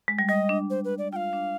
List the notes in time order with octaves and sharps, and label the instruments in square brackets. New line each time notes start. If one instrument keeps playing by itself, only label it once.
[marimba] G#3
G3
[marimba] G3 [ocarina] D#5
[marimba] D4
[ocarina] C5
B4
D5
[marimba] F4 [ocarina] F5 G5
[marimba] D4